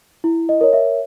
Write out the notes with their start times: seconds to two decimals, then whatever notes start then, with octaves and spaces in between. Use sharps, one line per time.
0.24 E4
0.49 D#5
0.61 A#4 C#5
0.73 E5